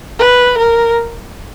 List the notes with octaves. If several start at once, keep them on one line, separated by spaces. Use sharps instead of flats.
B4
A#4